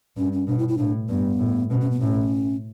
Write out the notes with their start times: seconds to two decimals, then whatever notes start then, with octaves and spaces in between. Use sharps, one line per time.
0.17 G2 C#4
0.33 C#4
0.47 B2 D4
0.58 E4
0.68 E4
0.78 A2 D4
1.09 G2 B3
1.39 A2
1.70 B2 C#4
1.81 C#4
1.91 B3
2.01 A2 C#4